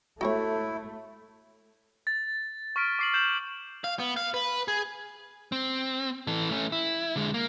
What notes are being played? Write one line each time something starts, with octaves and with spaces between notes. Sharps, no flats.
A3 E4 F#4 G4 C#5
A6
C#6 F6 B6 D7
D6 C7 F#7
G6 E7 F#7
F5
B3
F5
B4
G#4
C4
E3 A4
A3 C#4
E4
D3 G#3
A#3